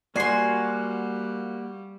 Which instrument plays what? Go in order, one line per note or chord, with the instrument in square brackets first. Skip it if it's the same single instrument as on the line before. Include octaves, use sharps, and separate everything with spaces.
[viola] G3 [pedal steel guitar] A#3 F#4 [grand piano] D5 C7 [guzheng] G#5 C6